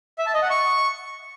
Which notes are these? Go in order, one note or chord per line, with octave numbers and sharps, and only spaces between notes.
E5
A5
D#5
F#5
C#6